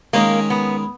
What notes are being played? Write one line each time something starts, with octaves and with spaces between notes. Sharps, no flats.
D#3 G#3 A#3 C#4 G#4
B3